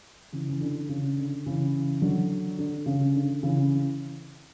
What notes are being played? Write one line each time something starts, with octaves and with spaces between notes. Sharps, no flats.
C#3 E3
E3
D3
C#3
D3
C#3 E3
D3 F#3
D3
C#3
D3
C#3 E3